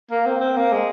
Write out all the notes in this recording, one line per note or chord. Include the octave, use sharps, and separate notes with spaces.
A#3
C4
C4
A#3
G#3